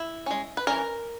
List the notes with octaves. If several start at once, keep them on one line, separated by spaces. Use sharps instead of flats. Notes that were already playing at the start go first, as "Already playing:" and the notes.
Already playing: E4
G#3 C#4
B4
E3 G3 C#4 A#4